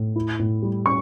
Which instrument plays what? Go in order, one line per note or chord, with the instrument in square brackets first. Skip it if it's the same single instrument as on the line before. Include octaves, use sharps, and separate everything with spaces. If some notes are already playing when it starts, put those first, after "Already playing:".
Already playing: [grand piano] A2
E4
A2
G3
C#4 C#6